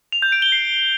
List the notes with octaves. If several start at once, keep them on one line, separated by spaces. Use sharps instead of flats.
F7
G6
D7
G7
C7